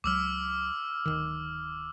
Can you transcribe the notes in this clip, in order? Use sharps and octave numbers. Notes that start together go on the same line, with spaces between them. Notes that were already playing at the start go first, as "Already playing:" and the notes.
C#2 F#3 D6 E6 F6
D1 C2 D#3